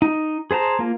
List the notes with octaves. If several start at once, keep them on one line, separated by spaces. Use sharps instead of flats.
D#4
G#4 C5 A5 A#5
A#3 F4